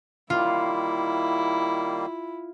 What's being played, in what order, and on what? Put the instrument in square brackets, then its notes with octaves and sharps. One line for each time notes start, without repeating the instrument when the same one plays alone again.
[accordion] D#3 G3 A#3 [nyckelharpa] E4 [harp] F4